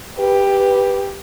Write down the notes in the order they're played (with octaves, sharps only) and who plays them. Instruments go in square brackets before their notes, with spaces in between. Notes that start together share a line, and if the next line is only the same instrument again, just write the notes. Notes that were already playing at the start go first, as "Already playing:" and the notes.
[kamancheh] G4 [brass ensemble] B4